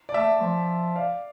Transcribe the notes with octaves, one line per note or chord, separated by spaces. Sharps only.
D5
A3 E5
F3
D5 F5